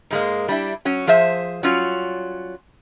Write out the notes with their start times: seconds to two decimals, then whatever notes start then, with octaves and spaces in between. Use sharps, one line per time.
0.10 G#2 G#3 A#3
0.48 G3 D4 E4
0.85 F#3 C#4 C#5
1.07 F3 G#4 C5 E5
1.63 F#3 G3 C#4 F4 C#5